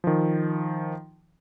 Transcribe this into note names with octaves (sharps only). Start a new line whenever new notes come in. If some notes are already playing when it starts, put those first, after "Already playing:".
D#3 F3